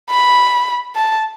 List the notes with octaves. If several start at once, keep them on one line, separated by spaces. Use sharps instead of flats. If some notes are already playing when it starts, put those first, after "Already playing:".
B5
A5